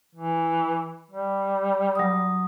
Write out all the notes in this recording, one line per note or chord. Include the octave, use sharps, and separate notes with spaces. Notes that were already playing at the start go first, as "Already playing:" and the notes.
E3
G3
F#3 D#6